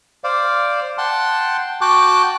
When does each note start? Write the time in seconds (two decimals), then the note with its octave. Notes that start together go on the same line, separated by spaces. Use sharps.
0.24 C5 D5 F5
0.98 F#5 G5 A5 C6
1.81 F#4 G5 A5 D6 F#6